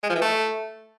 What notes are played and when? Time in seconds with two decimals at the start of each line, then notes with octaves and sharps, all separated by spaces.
0.03 G#3
0.09 F3
0.15 E3
0.21 A3